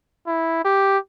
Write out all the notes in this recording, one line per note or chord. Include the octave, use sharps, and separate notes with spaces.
E4
G4